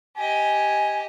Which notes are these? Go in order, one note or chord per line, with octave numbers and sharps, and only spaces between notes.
G4 D#5 G#5